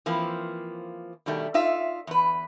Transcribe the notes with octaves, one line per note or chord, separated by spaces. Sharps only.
E3 F3 A#3 C4
B2 D#3 G3 A3
D#4 F4 E5
E2 B4